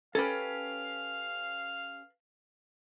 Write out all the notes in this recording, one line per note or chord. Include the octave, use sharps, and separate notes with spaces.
C#4 G4 A4 B4 F5